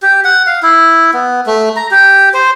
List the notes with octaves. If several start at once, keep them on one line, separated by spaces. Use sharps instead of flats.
G4
F#5
F5
E4
B3
A3
A#5
G4
C5